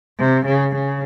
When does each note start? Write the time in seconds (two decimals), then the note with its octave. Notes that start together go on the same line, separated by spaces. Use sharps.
0.19 C3
0.46 C#3
0.75 C#3